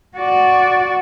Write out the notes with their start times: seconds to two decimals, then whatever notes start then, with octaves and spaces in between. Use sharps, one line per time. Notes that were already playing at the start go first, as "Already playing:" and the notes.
0.18 F#4 D5